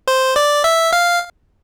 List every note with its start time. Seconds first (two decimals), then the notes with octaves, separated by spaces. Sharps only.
0.08 C5
0.36 D5
0.64 E5
0.93 F5